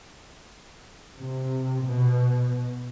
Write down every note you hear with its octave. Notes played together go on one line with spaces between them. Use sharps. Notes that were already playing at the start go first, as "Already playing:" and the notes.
C3
B2